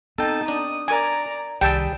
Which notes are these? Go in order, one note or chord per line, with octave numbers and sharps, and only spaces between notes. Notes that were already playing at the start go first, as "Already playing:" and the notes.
B3 C4 D#4 A4 G5 A5
D4 D#6
A#4 D5 G#5 A#5
C2 D#3 G3 G#4 G5 A5 E6